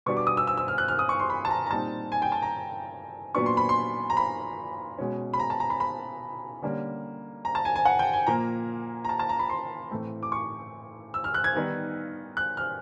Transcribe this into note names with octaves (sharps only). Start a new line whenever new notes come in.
B2 G3 B3 D4 C#6
D6
D#6
E6
E6
E6
F6
F#6
F6
D#6
C#6
C6
B5
A5
A#5
A#5
A#2 G3 C4 D#4 A5
G#5
G5
A5
A#5
A#2 F#3 B3 D4 C#6
C6
B5
C6
A#5
B5
B2 G#3 C#4
B5
A#5
A5
A#5
B5
B5
D3 G3 A#3 C#4
A#5
A5
G#5
G#5
F#5
G5
G#5
A#2 F3 A#3 A#5
A#5
A5
A5
A#5
B5
C6
A2 E3 A3 C4
D6
C#6
E6
F6
F#6
G#6
D#3 G3 B3 D#4
F#6
F6